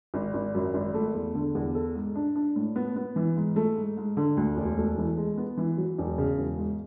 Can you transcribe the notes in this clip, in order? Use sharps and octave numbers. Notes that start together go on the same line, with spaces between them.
G#1
G#1
F#2
G#1
A3
E2
D3
E2
A4
G#2
D4
D4
A2
B3
B3
E3
G#2
A3
G#2
G#2
D3
D2
E1
A3
E3
G#3
B3
E3
F#3
E1
C#3
E1
G#2